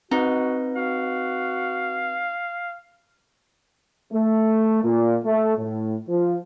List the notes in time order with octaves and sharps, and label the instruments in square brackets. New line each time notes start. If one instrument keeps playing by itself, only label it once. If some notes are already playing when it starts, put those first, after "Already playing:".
[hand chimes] C4 B4 [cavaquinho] D#4 [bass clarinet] F#4
[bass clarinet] F#4 [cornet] F5
[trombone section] A3
A#2
A3
A2
F3